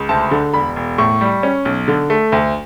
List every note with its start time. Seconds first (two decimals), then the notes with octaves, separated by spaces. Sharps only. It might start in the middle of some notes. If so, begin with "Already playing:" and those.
Already playing: C#2
0.09 D2 A5
0.31 D3
0.54 E1 B5
0.76 E1
0.98 A2 C#6
1.21 G3
1.43 C#4
1.65 B1
1.88 D3
2.10 A3
2.32 D2